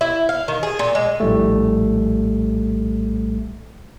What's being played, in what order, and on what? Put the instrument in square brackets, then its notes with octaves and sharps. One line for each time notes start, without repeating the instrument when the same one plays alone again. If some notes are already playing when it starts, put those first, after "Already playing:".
[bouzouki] E4
F5
D#3
G#4
A#2
G#3
[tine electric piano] A#1 A2 G3 A3